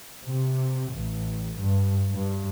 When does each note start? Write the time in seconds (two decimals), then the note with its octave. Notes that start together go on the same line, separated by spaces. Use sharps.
0.24 C3
0.93 A1
1.59 G2
2.12 G2